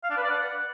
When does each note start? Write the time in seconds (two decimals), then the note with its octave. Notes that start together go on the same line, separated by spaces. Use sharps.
0.04 F5
0.10 D4
0.17 B4
0.23 D5
0.30 F#5